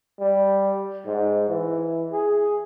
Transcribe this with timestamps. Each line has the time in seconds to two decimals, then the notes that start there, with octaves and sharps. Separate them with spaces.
0.20 G3
1.06 G#2
1.49 E3
2.12 G#4